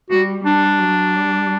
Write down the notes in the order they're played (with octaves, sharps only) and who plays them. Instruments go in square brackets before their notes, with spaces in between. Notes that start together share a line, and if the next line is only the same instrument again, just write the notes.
[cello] G3 [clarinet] F#4
[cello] G3 [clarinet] D4
[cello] F#3
G3